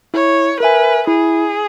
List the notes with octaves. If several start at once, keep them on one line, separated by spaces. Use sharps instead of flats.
E4 C#5
A#4 B4 E5 G#5
E4 G#4